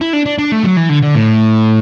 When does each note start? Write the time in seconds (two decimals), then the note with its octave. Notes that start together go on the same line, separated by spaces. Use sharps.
0.01 E4
0.13 D4
0.26 D4
0.38 D4
0.52 A3
0.64 F#3
0.77 E3
0.89 D3
1.02 D3
1.15 A2